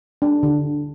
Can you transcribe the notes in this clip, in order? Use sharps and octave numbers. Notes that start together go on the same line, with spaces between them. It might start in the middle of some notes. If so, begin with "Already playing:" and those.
D4
D3